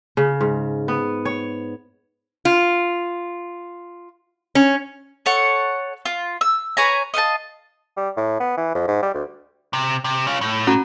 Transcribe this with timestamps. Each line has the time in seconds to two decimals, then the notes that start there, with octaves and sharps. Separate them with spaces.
0.17 C#3
0.41 G#2
0.88 B3
1.25 C#5
2.45 F4
4.55 C#4
5.26 A4 C#5 F#5
6.05 F4
6.41 E6
6.77 B4 C#5 G#5 A#5
7.14 D#5 F5 F#5 A5
7.97 G3
8.17 A2
8.40 B3
8.57 E3
8.75 F2
8.88 G#2
9.03 G3
9.14 D2
9.73 C3
10.04 C3
10.27 C#4 F4
10.41 A2
10.67 C#4 F#4 A#5